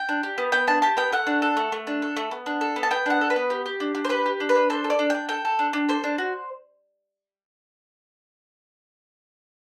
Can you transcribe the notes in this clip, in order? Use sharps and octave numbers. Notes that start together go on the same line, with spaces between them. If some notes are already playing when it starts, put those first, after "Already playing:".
Already playing: G5
D4
G4
B3
B3 G5
D4 A5
G4 A5
B3 G5
A3 F#5
D4
A4
A3
A3
D4
A4
A3
B3
D4
A4
B3
A5
B3 G5
D4 F#5
A4
B4
B3
G4
G4
D4
D4
C5
G4 B4
G4
D4
B4
D4
A4 C5
A4
D5
D4
D4 G5
A4 G5
A4
D4
D4
A4 C5
D4
F#4